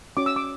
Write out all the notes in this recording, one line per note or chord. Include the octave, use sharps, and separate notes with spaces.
C#4 F#4 C#5 D6
E6
D6